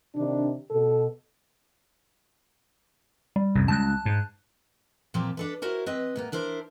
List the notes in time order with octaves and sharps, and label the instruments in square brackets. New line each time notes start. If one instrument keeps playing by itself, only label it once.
[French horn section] C3 D#3 D4
B2 A4
[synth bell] G3
[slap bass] C2 F#2
[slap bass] C#2 [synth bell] A5 F#6
[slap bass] G#2
[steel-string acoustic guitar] A#2 F3 G3 A#3 C4 G4
D4 A4 B4
E4 F#4 A#4 C5
C4 B4 D#5
A2 A#3 B3
D4 E4 A#4 C5